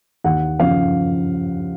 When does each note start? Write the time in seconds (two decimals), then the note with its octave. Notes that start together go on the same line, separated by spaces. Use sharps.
0.24 D#2 F#5
0.59 C#3 F3 F5